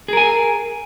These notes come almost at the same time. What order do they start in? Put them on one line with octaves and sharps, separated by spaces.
G#4 A#4 G#5